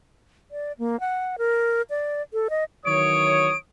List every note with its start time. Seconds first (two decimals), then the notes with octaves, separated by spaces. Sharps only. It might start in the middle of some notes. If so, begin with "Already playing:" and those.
0.51 D5
0.79 A#3
1.00 F#5
1.38 A#4
1.90 D5
2.33 A4
2.50 D#5
2.86 D#3 E3 F#3 C#5 D#6 D7